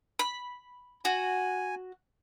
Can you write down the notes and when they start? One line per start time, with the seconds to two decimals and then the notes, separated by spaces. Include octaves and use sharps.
0.19 B5
1.05 F#4 G#5